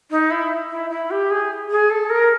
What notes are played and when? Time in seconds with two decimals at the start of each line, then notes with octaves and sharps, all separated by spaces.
0.11 D#4
0.31 E4
0.70 E4
0.90 E4
1.11 G4
1.31 G#4
1.71 G#4
1.90 A4
2.10 A#4